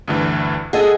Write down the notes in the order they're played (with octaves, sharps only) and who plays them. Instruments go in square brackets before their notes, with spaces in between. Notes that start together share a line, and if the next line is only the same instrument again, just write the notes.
[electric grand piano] D2 G2 E3
[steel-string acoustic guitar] G#4 [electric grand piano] A4 D#5 F#5